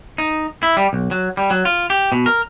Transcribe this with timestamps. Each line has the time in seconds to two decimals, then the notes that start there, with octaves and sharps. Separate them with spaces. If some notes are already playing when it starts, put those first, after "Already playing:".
0.18 D#4
0.63 E4
0.77 G3
0.93 B1
1.11 F#3
1.37 G3
1.50 F#3
1.65 F4
1.90 G4
2.12 B2
2.26 A#4